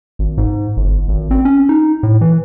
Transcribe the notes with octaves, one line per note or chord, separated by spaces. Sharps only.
G#1
G#2
G1
G#1
C4
C#4
D#4
A2
E3